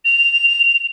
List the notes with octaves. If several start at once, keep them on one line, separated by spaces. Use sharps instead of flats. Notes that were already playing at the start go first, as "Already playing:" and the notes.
F7